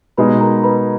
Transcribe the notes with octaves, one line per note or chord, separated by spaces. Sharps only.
B2 G#3 D#4 G#4 B4 B5
A#4 A#5
B4 B5